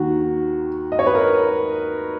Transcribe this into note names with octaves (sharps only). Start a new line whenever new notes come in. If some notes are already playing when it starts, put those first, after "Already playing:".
Already playing: D#2 D#3 F#4
D#5
C#5
B4
A#4